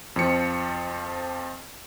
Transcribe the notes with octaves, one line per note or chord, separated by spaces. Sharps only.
F2 F3 C#7